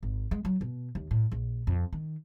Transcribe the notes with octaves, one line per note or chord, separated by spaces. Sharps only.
G#1
G#3
F#3
B2
D#2
A2
A#1
F2
D#3